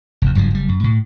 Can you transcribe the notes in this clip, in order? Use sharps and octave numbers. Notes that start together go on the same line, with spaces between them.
F1 D#2
F#1 G2 F3 F#3
F#1 G3
F#2
A2